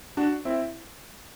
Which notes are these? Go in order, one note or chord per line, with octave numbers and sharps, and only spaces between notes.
D4 F#4
C4 E4